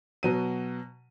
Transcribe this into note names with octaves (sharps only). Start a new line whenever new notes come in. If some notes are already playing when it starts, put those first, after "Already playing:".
B2 F#3 D#7